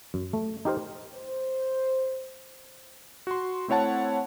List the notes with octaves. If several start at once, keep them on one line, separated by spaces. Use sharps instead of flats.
F#2
A3
D#4 G4 A#4 C5
C5
F#4 C6
A3 C4 E4 C#5 F#5 A5